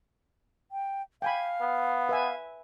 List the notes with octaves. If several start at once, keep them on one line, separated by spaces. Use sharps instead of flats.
G5
F5 G5 G#5 B5
B3
B4 E5 G#5